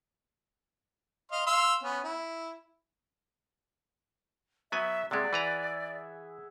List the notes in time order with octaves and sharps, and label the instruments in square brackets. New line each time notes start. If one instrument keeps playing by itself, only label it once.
[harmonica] D#5 F5 C6
F5 C6 E6
B3 C#4
E4
[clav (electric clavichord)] F#3 B3 G#5 [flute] E5
[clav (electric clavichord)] C3 G#3 [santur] G#4 E5 F#5 [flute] D5
[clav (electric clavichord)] E3 B4 A#5